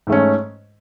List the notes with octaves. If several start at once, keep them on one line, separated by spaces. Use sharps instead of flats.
G#2 A3 C#4